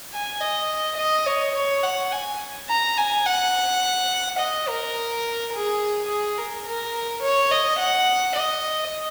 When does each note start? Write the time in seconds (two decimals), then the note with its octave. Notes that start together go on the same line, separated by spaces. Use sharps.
0.13 G#5
0.41 D#5
0.97 D#5
1.26 C#5
1.55 C#5
1.83 F#5
2.11 G#5
2.69 A#5
2.97 G#5
3.26 F#5
4.39 D#5
4.68 A#4
5.53 G#4
6.09 G#4
6.37 A#4
6.66 A#4
7.22 C#5
7.51 D#5
7.79 F#5
8.36 D#5